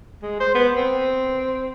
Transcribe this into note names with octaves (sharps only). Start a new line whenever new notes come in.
G#3
C5
B3
C4